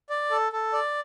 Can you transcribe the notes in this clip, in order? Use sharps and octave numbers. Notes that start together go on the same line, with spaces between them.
D5
A4
A4
D5